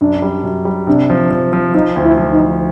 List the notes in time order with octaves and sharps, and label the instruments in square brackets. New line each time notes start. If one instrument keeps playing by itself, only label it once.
[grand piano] F#2 [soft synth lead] D4
[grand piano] G3
F#2
G3
[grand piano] C3 [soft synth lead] D4
[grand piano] F3
F3
F3
[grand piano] F3 [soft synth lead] D#4
[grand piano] D2
[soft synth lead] E4
[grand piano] F3
[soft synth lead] D#4
[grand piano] F3